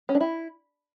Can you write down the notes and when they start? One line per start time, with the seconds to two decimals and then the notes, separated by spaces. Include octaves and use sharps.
0.09 C#4
0.15 D4
0.21 E4